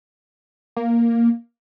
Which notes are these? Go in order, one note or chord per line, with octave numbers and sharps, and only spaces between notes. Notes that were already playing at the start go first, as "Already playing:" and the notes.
A#3